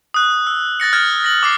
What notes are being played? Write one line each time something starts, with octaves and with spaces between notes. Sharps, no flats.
D#6 F#6
E6
F#6 A6 A#6 C#7
F6 G#6 A6
A#6 F#7
D6 F6 C7